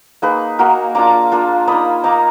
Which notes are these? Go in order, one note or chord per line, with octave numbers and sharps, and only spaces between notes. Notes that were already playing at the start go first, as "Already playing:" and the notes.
A#3 D#4 G#4 B4
A#3 D#4 F#4 A#4
A#3 D4 F4 A#5 D6
A#3 D4 F4
A#3 D#4 B5 D#6
A#3 D#4 A#5 D6